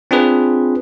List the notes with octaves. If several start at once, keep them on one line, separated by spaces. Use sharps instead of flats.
C4 D4 F4 G#4 B4